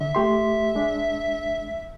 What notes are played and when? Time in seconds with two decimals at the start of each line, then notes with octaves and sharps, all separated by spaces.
0.01 D3 E5
0.15 A3 G4 C6
0.75 G#3 D4